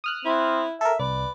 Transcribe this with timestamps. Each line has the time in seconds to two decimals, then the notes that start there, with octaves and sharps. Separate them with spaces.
0.04 D#6 F6 F#6
0.25 C4 E4
0.81 A4 A#4 E5
1.00 C2 B4 D5